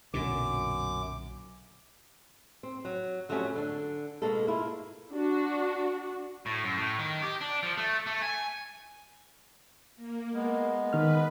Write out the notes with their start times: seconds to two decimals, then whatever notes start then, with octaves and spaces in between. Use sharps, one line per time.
0.14 B1 F#2 A#2 D3 D6
2.63 C4
2.85 F#3
3.29 F2 F#3 G3 A3 C#4 G#5
3.55 D3 D4
4.22 B2 G#3 A#3 A4
4.47 A#3 E4 F4
5.12 D4 F#4
6.46 A2
6.64 F#2
6.77 A2
6.98 D#3
7.22 G4
7.41 D4
7.63 F3
7.77 A3
8.06 A3
8.22 G#5
9.96 A#3
10.33 G#3 B3
10.93 D#3 B4 F6